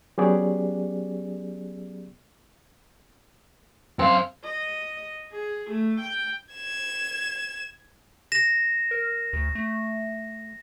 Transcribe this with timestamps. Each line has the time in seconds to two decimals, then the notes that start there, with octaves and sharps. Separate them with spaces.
0.18 F#3 B3 C#4 G4 G#4 D5
3.99 F#2 C4 F5
4.44 D#5
5.32 G#4
5.70 A3
6.00 G5
6.54 G#6 E7
8.32 A#6 E7
8.91 A#4
9.33 D2
9.55 A3